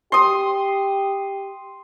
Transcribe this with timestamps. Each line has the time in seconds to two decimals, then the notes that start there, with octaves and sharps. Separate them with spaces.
0.12 G4 C6 D#6